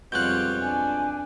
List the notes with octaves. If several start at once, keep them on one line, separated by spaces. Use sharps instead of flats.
F2 B2 G3 G#3 F4 C#5 F#6 G6
D4 G#5